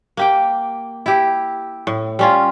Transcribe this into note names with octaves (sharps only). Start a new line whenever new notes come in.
A#3 G4 G5
E4 G4
A2
G3 C#4 F4